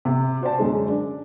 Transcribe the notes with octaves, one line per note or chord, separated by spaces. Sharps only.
C3
F#4 C5 D5 A5
F#2 D3 G#3
D4 D5